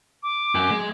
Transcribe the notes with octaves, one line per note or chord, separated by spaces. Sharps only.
D6
F#2
G#3